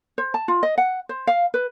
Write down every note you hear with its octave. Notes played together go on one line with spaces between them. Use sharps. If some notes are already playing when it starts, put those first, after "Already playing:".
C5
A5
F4
D#5
F#5
C5
F5
B4